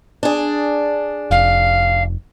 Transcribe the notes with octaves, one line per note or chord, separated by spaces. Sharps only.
D4 G#4
F1 F5